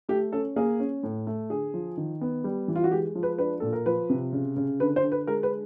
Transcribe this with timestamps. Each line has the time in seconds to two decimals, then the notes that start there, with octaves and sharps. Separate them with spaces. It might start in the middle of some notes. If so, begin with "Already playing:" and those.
0.09 A3 G4
0.32 C#4 A4
0.56 A#3 G#4
0.80 C#4
1.03 A2
1.27 A3
1.50 D3 G#4
1.74 F3
1.97 D#3
2.21 B3
2.44 G3
2.68 E3
2.75 F4
2.84 F#4
2.91 G#3 G4
3.15 F3
3.23 B4
3.38 D4 B4
3.60 A#2 A4
3.73 A#4
3.86 F3 B4
4.10 C3
4.33 C#3
4.56 C#3
4.80 D3 B4
4.96 C5
5.04 D3
5.12 B4
5.27 G#3 A#4
5.43 B4